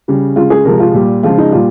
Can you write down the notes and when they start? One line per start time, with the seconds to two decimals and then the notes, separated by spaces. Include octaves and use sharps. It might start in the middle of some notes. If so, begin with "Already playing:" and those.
0.08 C#3 G3
0.36 C#3 G#3 F4
0.50 G#4
0.65 C3 F3 G#3 A#4
0.80 F4
0.94 A#2 G3
1.23 C#3 F3 G#3 F4
1.38 D#4
1.52 A#2 G3 F4